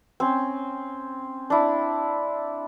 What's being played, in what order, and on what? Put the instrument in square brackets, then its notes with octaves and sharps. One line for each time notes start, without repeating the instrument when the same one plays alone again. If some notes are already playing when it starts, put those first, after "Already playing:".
[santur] C4 C#4
D4 E4